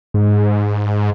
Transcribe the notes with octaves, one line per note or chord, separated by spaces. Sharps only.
G#2